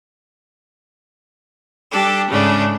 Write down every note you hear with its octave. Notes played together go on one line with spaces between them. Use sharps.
G3 D4 G4 A4
G#2 C#3 A3 D4